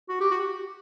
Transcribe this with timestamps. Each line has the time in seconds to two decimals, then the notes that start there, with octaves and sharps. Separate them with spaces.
0.09 F#4
0.21 G4
0.31 F#4